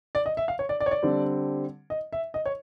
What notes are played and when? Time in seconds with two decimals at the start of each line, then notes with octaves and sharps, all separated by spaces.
0.15 D5
0.26 D#5
0.37 E5
0.48 F5
0.59 C#5
0.69 D5
0.80 D5
0.86 C#5
0.91 D5
1.03 D3 G3 C4
1.90 D#5
2.13 E5
2.34 D#5
2.46 C#5